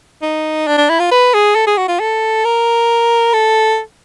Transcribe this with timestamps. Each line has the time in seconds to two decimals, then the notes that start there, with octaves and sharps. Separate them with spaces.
0.22 D#4
0.67 D4
0.78 D4
0.89 E4
1.00 F4
1.11 B4
1.34 G#4
1.56 A4
1.67 G#4
1.77 F#4
1.88 F4
2.00 A4
2.45 A#4
3.33 A4